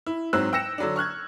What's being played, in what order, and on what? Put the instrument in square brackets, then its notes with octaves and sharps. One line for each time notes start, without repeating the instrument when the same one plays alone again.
[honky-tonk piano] E4
G#2 F#3 C4 E6 F#6
G5 E6 A#6 C#7 E7
D3 F#3 D4
C#6 F6 F#6 G#6